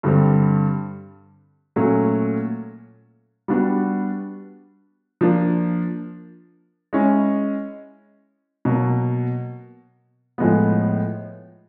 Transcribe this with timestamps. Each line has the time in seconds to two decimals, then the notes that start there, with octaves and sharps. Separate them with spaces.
0.03 G2 D3 G3 C4
1.76 A#2 F#3 A3 C#4
3.48 G3 B3 D4 F#4
5.21 F3 A#3 D4
6.93 G#3 C#4 E4
8.65 B2 F#3 A#3
10.38 A2 F3 G#3 B3